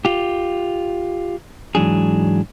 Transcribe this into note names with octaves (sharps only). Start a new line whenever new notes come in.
F4 G4
G#2 E3 F#3 D4 G#4